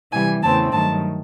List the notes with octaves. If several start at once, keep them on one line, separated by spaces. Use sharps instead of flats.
C3 E3 G3 G#5
E2 C#3 E3 A3 C4 A5
G2 D#3 F#3 A3 A5